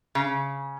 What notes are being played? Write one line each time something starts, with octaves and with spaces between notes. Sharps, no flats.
C#3